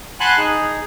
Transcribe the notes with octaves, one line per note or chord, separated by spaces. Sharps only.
F#5 G#5 A5 B5 C6 F#6
D#4 G#4